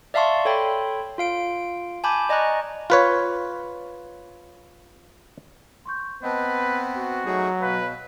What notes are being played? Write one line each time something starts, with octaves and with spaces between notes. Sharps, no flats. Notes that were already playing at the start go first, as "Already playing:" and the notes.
D5 E5 F5 A5 C6 C#6
A4 C#5 G5 B5 C6
F4 F5 D7
G#5 A5 B5 D6 G6
D5 D#5 G#5 A#5 C#6 F#6
F4 B4 C#5
C6 C#6 G6
B3 C4 B4 D#5 A5 B5
F#4
F#3 A3 D#4 G#4
B2 B4 F5 B5 B6